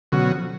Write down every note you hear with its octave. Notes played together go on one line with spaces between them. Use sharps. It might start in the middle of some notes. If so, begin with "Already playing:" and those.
B2 D3 F#3 C#4 F#4
F3